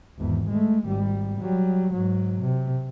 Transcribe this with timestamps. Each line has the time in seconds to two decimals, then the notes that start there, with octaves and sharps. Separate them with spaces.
0.18 G#1 E2
0.49 G#3 A3
0.85 G#1 G3
1.40 F#3 G3
1.93 G#2 F#3
2.41 C3